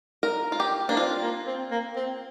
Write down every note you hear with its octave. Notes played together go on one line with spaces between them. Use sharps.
A#4
F4
G4
A#3 D4
C4 F4
A#3
C4
A#3
C4